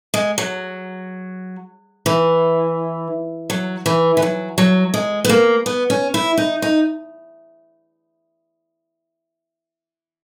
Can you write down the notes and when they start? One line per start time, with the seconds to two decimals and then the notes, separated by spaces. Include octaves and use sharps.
0.14 G#3
0.38 F#3
2.06 E3
3.50 F#3
3.86 E3
4.17 E3
4.22 F#3
4.58 F#3
4.94 G#3
5.25 B3
5.29 A#3
5.66 B3
5.90 C#4
6.14 E4
6.38 D#4
6.62 D#4